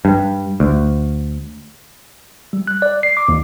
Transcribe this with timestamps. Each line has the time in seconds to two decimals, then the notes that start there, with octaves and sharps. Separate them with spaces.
0.05 G2
0.60 D2
2.53 G3
2.67 F#6
2.82 D5
3.03 C7
3.17 D6
3.28 D#2